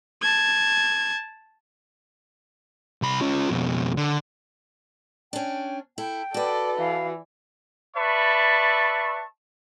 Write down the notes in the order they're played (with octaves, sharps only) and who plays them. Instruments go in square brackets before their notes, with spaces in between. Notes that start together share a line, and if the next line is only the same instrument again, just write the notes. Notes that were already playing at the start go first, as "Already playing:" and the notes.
[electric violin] A5 G#6
[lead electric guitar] C2 B5
C#4 F4
F2 B2
D3
[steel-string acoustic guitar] C#4 D4 [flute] G5
[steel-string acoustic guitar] E4 A4 [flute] G5
[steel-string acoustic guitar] F#4 B4 [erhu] A4 [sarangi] D5
[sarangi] E3 [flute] F5
[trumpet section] B4 D5 E5 A5 B5 C#6